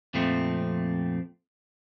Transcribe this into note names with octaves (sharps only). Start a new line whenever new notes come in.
F2 A#2 F3 A3 C4